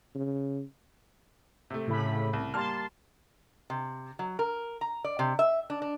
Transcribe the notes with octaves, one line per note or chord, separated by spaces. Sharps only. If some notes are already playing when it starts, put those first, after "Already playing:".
C#3
C3 A3
A2 C#3 B5
C2
G3 A#3 A5 C6 F6
C3
F#3
A#4
A#5
D5
C3
E5
D4
D4